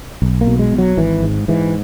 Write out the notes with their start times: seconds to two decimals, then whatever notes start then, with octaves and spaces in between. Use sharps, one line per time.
0.22 B1
0.41 A#3
0.47 B2
0.59 G#3
0.73 B1
0.78 F#3
0.97 G#1 E3
1.23 G#2
1.48 G#2 E3